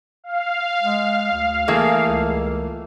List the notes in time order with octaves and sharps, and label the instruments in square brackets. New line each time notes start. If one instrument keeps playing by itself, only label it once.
[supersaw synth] F5
[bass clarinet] G#3
D2
[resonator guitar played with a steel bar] E3 A3 A#3 [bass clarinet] G#4
[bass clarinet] C#2